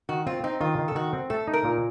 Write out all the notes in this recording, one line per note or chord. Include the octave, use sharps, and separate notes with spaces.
D#3 F#4
C4 F4
C4 D#4
D#3 F4
D#3
A4
D#3 F#4
C4
A3 A4
D#4
A#4
A#2